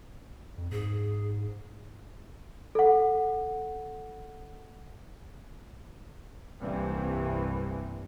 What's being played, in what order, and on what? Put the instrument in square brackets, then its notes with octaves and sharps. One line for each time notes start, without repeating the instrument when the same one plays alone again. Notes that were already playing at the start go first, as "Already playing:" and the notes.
[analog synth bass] F2
[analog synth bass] G#2 [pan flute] G#4
[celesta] A4 F#5
[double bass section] C2 G2 E3 A#3 C4